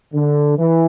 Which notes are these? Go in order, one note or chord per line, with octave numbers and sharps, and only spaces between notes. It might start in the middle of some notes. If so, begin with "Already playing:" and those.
D3
E3